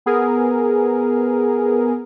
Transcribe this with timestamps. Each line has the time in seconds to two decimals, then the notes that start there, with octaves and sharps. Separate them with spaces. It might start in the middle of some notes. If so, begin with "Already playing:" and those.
0.06 B3 G#4 A#4